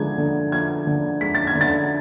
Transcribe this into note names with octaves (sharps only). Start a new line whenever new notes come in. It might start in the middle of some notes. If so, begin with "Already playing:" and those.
Already playing: D3 F3 G#3 G#6
D3
F3 G#6
D3
G#3 B6
A6
G#6
D3
A6